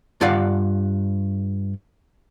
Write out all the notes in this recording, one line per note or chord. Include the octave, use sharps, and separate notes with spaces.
G2 F4 G4 D5 F5 F#5